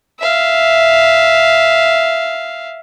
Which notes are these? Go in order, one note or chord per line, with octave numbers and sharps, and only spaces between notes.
E5 F5